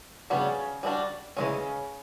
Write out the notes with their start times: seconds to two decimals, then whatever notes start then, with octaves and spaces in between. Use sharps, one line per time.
0.30 C#3 G3 B3 D4 F#4
0.83 G3 B3 D4 F#4
1.36 C#3 E3 G#3 C#4